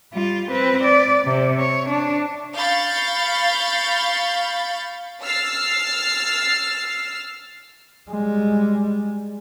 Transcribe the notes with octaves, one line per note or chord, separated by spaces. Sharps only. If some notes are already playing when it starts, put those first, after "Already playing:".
G3 F4
C4 B4
D5
C3
C#5
D4
F5 B5 C#6 G6 A6
E6 F6 A6 C7
G3 G#3